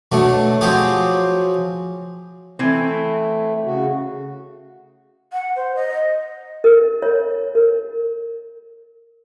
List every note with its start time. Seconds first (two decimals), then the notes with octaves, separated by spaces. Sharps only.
0.12 B2 F#3 A3 D4
0.61 F3 F#3 C4 G4 G#4
2.59 E3 A3 C4
3.65 C#3 F#4
5.33 F#5
5.56 C5
5.75 D#5
6.64 A#4
7.02 C#5
7.55 A#4